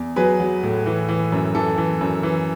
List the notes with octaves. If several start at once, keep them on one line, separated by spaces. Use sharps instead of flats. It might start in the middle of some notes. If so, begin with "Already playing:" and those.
Already playing: E2
F#3 G#4 B4
F#3
A2
E3
E3
F#2
E3 A4
E3
F#2
E3